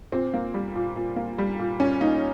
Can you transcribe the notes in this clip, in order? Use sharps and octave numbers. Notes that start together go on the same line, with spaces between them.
A#2 C4
A#3
G3
A#2
A#2
A#3
G3
A#2
A#2 C#4
A#3 D#4